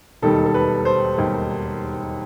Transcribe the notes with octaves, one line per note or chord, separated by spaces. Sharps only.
E1 D#2 D#3 G3 A4
A4
B4
C5
E1 D#2 D#3 G3